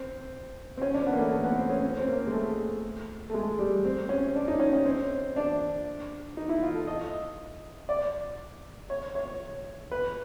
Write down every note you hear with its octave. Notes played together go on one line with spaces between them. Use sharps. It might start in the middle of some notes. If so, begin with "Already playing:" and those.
Already playing: C4
C4
C#4
D4
B3
A#3
A3
A3
B3
C4
C#4
C4
C#4
C4
A#3
G#3
A3
A3
G#3
G3
C4
C#4
D4
D#4
C#4
C#4
C4
D4
D#4
E4
F4
A4
D#5
D5
C#5
C#5
B4